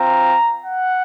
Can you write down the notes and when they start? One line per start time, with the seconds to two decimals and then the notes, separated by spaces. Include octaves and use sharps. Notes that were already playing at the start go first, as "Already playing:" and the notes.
Already playing: C4 F4 A#5
0.63 F#5